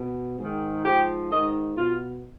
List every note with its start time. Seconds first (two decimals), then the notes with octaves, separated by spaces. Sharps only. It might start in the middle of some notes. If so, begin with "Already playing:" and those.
Already playing: B2
0.39 G#2 D#3
0.85 G#2 F3 G4
1.31 G#2 D#3 D#5
1.77 B2 F4